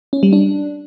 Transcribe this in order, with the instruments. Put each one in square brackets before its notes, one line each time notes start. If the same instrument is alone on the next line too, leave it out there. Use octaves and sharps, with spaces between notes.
[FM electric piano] C#4
G3
D4